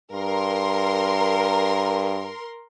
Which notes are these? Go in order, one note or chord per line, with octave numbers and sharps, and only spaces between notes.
G2 A#4 C6